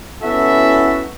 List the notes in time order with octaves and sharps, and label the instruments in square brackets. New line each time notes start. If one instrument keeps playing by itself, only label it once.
[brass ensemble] B3 C#4 E4 F#4 A4 E5